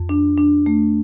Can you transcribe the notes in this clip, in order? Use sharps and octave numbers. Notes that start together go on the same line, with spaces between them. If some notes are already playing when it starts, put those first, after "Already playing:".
Already playing: F2
D4
D4
A3